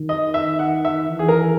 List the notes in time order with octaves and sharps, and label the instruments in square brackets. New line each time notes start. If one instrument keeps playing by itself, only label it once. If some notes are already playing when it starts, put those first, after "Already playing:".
Already playing: [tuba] D#3
[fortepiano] D#5
E5
F#5
E5
[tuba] E3
[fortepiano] G#4
A#4